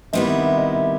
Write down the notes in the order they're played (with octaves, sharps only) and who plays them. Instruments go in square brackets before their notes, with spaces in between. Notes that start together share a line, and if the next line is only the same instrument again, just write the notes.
[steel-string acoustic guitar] C3 D#3 G3 B3 E4 [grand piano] D#5
[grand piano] E5
E5
D#5
E5